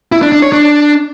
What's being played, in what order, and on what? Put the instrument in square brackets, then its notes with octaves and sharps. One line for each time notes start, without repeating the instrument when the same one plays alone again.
[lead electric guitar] E4
D4
D4
C#5
D4